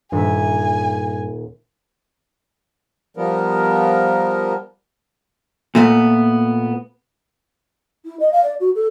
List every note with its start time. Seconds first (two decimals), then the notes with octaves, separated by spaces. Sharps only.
0.12 D#1 G2 E5 G#5
3.17 F3 G3 B3 A#4
5.75 A#2 A3 B3
8.05 E4
8.20 D#5
8.32 F5
8.44 D5
8.60 F#4
8.75 A4